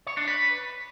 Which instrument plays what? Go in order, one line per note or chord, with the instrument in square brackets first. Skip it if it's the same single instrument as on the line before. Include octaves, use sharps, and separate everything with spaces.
[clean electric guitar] C#5
D4
B4